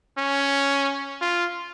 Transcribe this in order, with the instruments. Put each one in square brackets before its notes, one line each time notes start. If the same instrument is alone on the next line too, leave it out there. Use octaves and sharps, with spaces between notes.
[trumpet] C#4
F4